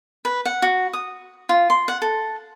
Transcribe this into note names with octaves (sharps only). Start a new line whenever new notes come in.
B4
F#5
F#4
D#6
F4
C6
F#5
A4